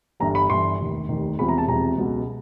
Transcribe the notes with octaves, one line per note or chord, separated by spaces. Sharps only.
G1 G2 E3 A#5
B5
G1 G2 E3 C6
F1 D#2 D#3
F1 D#2 D#3
E1 E2 C3 F3 B5
A#5
A5
E1 E2 C3 F3 A#5
C#2 B2 F#3